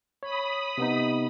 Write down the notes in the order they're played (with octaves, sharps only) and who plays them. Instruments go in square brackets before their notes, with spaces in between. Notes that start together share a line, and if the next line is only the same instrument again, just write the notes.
[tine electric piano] C#5 [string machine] B5 D#6
[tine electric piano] C3 B3 D#4